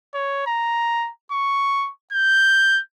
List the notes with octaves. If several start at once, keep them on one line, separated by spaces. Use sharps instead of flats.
C#5
A#5
C#6
G6